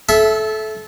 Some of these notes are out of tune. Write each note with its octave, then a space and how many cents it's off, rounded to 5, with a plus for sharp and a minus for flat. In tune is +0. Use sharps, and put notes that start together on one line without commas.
A4 -25 E5 +0